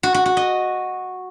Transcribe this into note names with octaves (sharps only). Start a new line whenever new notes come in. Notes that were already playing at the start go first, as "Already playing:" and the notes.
F#4
F#4
F#4
D#5